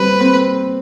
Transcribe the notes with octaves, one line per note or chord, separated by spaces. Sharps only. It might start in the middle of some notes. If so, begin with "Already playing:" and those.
Already playing: G3 C4 B4
C4